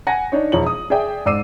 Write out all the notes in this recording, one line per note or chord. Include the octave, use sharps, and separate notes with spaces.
F#5 G#5 A#6
D4 D#4 C#5
E1 F3 C#5 F#7
D#6
G#4 D5 E5 G5
G#2 D5 D6 E6 C7 D#7